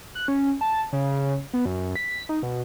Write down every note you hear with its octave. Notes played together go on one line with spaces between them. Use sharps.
F#6
C#4
A5
C#3
B3
F#2
B6
D#4
B2